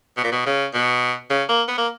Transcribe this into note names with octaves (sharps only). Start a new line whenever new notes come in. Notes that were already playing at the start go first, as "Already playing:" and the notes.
B2
A#2
B2
C#3
B2
C#3
A#3
B3
A#3